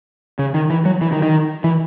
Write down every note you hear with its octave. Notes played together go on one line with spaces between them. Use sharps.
C#3
D#3
E3
F#3
E3
D#3
D#3
E3